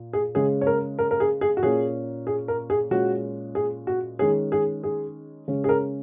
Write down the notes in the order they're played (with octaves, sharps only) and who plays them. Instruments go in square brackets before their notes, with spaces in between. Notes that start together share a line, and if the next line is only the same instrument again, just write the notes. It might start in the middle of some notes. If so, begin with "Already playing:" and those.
Already playing: [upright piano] A#2
G#4
C#3 G#3 C#4 G#4
C#5
A#4
A#4
A#4
G#4
G#4
F#4
A#2 A#3 C#4 G#4
G#4
A#4
G#4
A#2 G#3 C#4 F#4
G#4
F#4
D#3 G#3 C#4 G#4
G#4
G#4
C#3 G#3 C#4
G#4
A#4